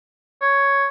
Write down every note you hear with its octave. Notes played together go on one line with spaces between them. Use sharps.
C#5